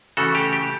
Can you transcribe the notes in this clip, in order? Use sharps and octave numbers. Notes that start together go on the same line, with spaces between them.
C#3 E3 A3 F#4 A4
G4
G4